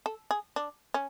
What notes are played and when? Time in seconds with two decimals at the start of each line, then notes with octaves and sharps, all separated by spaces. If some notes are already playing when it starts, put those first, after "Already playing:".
0.06 A4
0.31 G#4
0.56 D4
0.94 C#4